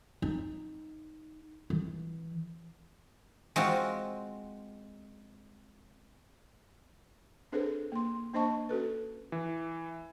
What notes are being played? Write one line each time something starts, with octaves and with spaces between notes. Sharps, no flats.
D#4
E3
G#3 C4 F4 F#4
C4 D4 G#4 A4 B4 C5
A#3 C6
A#3 D4 C5 D#5 A5 C#6
C#4 F#4 A4 B4
E3